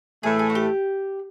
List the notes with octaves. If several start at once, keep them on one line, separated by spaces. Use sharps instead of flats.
A2 E3 A3 G#4
G#4
F#4
G4